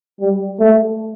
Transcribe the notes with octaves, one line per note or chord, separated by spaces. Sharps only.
G3
A3